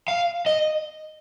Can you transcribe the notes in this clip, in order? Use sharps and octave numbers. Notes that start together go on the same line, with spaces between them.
F5
D#5